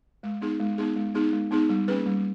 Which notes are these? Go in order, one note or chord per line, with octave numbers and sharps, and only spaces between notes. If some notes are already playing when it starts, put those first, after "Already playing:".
G#3
B3 D#4 G#4
G#3
B3 D#4 G#4
G#3
B3 D#4 G#4
G#3
B3 D#4 G#4
G3
A#3 C#4 G#4 B4
G3